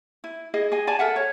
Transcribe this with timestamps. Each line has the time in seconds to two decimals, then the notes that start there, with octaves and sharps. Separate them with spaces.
0.24 E4
0.54 E4 G#4 D#5
0.72 G#4 D#5 G#5
0.87 D5 G#5 A5
0.99 A4 A#4 E5 F#5
1.16 C#5